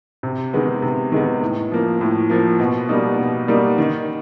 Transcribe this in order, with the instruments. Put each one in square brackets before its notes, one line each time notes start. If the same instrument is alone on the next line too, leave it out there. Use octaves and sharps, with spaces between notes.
[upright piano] C3
D#3 G#3 B3
C3
D#3 G#3 B3
A2
F3 A#3
A2
F3 A#3
B2
G3 A#3 D#4
B2
G3 A#3 D#4
D#3